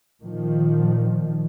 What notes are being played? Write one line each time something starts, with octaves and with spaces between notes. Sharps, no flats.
A#2 D#3 F3